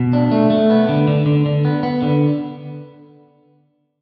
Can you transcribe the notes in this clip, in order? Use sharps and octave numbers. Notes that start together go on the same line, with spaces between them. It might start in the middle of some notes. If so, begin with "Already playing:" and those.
Already playing: B2
D4
A3
A3
B3
D3
D3
D3
D3
B3
B3
D3